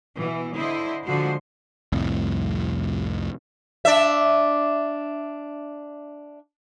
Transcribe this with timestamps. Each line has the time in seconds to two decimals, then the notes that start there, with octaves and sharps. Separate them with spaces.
0.18 B2 E3
0.56 D3 E4 C5 D#5
1.05 D3 F3 G#3 F#4 C5
1.92 C2 F2 A2
3.85 D4 E5